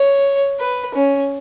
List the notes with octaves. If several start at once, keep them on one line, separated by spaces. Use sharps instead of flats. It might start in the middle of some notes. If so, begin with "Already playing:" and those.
Already playing: C#5
B4
C#4